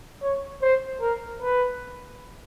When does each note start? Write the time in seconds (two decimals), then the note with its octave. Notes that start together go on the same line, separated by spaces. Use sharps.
0.22 C#5
0.62 C5
1.01 A#4
1.41 B4